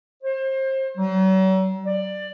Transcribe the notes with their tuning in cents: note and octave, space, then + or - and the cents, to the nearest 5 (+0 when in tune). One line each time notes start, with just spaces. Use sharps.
C5 +30
F#3 +40
D5 +15